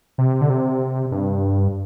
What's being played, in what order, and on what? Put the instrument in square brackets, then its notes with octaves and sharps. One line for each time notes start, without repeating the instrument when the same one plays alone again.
[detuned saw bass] C3
D3
C3
G2